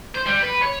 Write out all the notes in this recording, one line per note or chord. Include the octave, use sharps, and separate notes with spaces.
C5
G3
B4
C#5